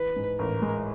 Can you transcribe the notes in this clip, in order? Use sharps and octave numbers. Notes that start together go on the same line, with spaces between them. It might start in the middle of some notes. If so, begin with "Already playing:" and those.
Already playing: E3 B4
G#2
A1 A#4
G#3